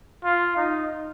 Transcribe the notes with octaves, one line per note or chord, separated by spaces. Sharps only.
F4
D#4